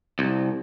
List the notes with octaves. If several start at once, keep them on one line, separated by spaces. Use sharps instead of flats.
C2